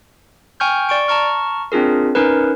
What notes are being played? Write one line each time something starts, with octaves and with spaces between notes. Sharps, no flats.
G5 G#5 C#6 F6 G6
D5 C#6 D7
A5 A#5 C#6 F6
C4 D4 F4 G#4 A#4
C#4 D#4 A#4 B4